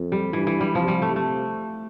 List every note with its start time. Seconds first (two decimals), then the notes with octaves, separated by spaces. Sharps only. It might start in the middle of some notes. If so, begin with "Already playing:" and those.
Already playing: F2
0.12 G3
0.33 G2 E3
0.47 E3
0.61 G3
0.75 C3 F3
0.88 G3
1.02 A3
1.16 A3